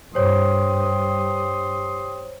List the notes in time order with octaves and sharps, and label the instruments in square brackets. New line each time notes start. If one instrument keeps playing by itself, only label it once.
[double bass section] G2 [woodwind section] G4 C6 D#6 [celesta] C5 C#5